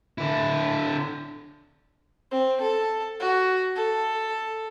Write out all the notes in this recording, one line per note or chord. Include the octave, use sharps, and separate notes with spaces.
D3 E4
C4
A4
F#4
A4